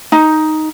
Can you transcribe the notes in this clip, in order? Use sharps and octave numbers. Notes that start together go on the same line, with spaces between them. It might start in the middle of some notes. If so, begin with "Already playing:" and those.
D#4